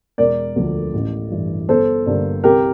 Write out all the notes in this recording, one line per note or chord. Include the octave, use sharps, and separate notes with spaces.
E1 A#4 D5
D2 D3 F3 A3
A1
G2 E3
G1 A4 C5
G2 D3 G3 A#3
C2 G4 A#4